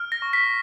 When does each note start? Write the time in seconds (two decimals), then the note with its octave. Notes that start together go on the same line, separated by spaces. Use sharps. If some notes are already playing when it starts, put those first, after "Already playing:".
Already playing: F6
0.12 A#6
0.22 C#6
0.33 B6